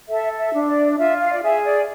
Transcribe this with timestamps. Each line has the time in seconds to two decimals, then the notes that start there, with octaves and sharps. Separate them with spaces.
0.09 A4 E5
0.38 E5
0.53 D4
0.68 D5
0.98 F4 E5
1.20 F5
1.32 D5
1.42 G#4 E5
1.65 D5